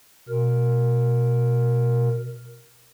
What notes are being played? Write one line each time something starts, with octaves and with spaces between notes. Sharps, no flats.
B2 A#4